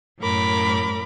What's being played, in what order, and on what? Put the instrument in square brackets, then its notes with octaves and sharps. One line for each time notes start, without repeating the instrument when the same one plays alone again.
[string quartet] F#2 A2 A#4 B5 D6